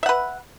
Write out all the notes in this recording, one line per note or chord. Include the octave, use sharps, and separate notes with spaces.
B4 E5 F#5